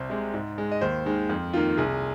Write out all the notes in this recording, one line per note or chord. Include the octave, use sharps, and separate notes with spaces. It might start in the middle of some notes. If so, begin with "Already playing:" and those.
Already playing: C2 C5
C3 G#3
G#2
G#3
D#5
D#2 C5
D#3 G#3
F2
D#3 A#3 F4
C2 G#4